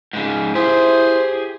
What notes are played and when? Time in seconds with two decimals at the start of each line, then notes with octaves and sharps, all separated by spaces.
0.13 G#2 C#3
0.55 E4 G4 G#4 C5